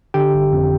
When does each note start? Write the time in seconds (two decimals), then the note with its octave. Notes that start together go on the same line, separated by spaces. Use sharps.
0.14 D3 G4 G5
0.34 G1
0.53 F2